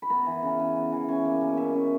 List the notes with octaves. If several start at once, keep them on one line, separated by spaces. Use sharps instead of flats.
B5
B3 A#5
E3
C#3
C#3
B3
E3
C#4 G#5
A#3
B2
B2 E5
C#4